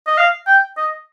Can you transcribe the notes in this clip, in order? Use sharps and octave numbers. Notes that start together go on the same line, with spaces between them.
D#5
F5
G5
D#5